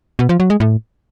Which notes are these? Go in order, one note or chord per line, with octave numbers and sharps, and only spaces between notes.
B2
F3
F#3
G#3
A2